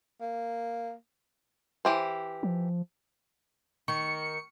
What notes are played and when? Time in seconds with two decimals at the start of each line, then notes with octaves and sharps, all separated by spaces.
0.21 A#3
1.85 E3 G4 C5
2.43 F3
3.88 D#3 C#6 C#7